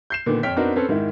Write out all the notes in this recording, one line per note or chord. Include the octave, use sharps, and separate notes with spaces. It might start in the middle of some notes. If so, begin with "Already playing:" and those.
G6 C7 E7
A#2 D3 D#3 B3
F2 C#5 G5 F6 B6
B3 C4 D4 D#4 F#4 A#4
C4 C#4 A4 B4
G#2 D#3 E4